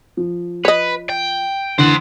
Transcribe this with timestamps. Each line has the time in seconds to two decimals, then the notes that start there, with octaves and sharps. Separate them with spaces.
0.17 F3
0.65 B4 C#5 D#5
1.09 G5
1.79 D3 E3 C5 F#5